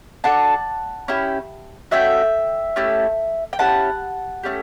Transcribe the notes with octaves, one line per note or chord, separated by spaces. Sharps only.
D4 F#4 A4 F#5 A5
C#4 E4 G4
A3 C#4 F#4 E5 G5
A3 C#4 E4 G4
G5
C#4 E4 G4 F#5 A5
A3 C#4 G4